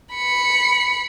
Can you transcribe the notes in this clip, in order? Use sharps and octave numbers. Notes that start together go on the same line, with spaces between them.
B5 C#7